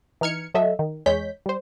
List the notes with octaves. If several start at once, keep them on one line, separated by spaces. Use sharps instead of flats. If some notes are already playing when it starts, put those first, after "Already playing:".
E3 D#4 F6 G#6 C#7
F#3 A4 D#5 E5
D#3
E2 G#3 C#5 G6 B6
G3 C5